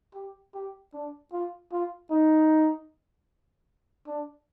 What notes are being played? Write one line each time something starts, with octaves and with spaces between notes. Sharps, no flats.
G4
G4
D4
F4
F4
D#4
D4